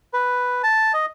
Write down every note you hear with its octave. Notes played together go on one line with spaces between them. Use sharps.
B4
A5
D#5